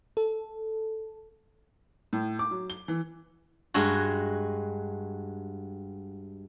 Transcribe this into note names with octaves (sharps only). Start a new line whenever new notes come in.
A4
A2
D6
F#3
G7
E3
G2 G#3 F#4